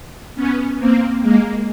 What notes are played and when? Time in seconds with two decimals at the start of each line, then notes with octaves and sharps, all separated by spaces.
0.35 B3 C#4
0.79 A#3 C4
1.22 G#3 A#3